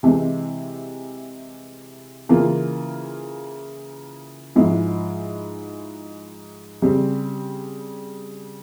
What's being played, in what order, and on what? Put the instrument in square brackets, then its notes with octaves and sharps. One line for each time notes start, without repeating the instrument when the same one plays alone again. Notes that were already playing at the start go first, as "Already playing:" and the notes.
[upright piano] C3 E3 G#3 C4
C#3 E3 A#3 F4
G#2 F3 G#3 E4
C#3 G3 C4